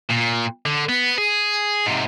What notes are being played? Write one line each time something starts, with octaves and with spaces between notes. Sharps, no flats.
A#2
D3
B3
G#4
G#2 C3